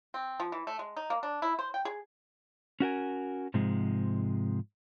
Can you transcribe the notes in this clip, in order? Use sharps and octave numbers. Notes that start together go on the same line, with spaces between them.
C4
F3
E3
A3
G#3
D#4
A#3
D4
E4
C5
G5
G#4
C#4 F#4 A#4 G#5
G#2 C3 F3 G#3